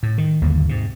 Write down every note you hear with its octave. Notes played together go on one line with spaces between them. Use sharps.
A2
D#3
G1 D#2 D3 A#3
G#2 C3